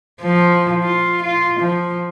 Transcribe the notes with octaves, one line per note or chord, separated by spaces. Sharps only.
F3
F4
F4
F3